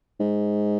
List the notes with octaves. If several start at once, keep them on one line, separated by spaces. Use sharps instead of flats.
G#2